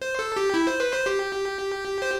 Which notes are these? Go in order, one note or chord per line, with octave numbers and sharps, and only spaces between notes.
C5
A4
G4
E4
C5
B4
C5
G4
C5